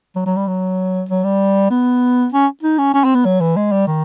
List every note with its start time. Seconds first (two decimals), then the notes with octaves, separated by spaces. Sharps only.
0.16 F#3
0.26 F#3
0.36 G3
0.47 F#3
1.09 F#3
1.24 G3
1.70 B3
2.32 C#4
2.63 D#4
2.78 C#4
2.94 C#4
3.04 C4
3.14 B3
3.25 F#3
3.41 E3
3.56 G#3
3.72 G3
3.87 D#3